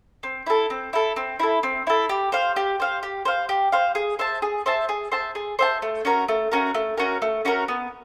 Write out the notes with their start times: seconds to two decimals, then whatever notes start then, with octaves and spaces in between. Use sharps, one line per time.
0.23 C4
0.46 E4 A4
0.70 C4
0.93 E4 A4
1.16 C4
1.39 E4 A4
1.63 C4
1.87 E4 A4
2.09 G4
2.32 C5 F5
2.56 G4
2.80 C5 F5
3.03 G4
3.25 C5 F5
3.49 G4
3.72 C5 F5
3.95 G#4
4.19 C5 E5 A5
4.42 G#4
4.66 C5 E5 A5
4.89 G#4
5.12 C5 E5 A5
5.35 G#4
5.59 C5 E5 A5
5.82 A3
6.05 C#4 F#4 A#4
6.29 A3
6.52 C#4 F#4 A#4
6.74 A3
6.98 C#4 F#4 A#4
7.22 A3
7.45 C#4 F#4 A#4
7.68 B3